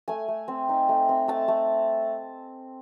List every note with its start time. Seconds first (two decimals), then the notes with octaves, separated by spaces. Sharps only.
0.08 A3 G#5
0.28 A3
0.48 C4
0.69 D#4
0.89 A3
1.09 C4
1.28 A3 A5
1.48 A3